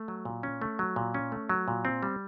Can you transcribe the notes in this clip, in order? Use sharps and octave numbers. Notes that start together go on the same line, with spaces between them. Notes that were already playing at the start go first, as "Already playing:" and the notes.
Already playing: A3
F#3
A#2
C#4
A3
F#3
A#2
C#4
A3
F#3
A#2
C4
G3